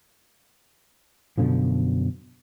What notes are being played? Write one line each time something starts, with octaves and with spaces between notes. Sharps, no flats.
F#2 B2 D3 F3